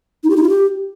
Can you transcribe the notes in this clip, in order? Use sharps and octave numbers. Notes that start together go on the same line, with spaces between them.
D#4
G4
D#4
F4
G4